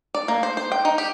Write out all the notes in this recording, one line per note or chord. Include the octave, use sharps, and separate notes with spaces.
D5
A#3
C5
C5
G5
D#4
G4